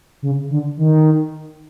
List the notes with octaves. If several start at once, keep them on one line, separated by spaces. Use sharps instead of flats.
C#3
D3
D#3